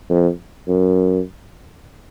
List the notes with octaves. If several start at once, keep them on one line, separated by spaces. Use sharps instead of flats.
F2
F#2